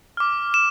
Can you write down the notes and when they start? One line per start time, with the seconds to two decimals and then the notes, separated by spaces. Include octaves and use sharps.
0.17 D6 F6
0.54 E7